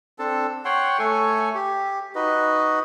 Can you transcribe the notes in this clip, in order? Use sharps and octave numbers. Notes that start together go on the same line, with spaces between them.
C4 D4 A4 A5
C#5 F#5 G5 C6
A3 A4 C#5 G#5
G4
D#4 F#4 B4 D#5